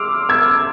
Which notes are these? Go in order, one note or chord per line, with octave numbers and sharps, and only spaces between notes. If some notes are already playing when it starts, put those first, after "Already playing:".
Already playing: C6 D6 E6 F6
E6 G#6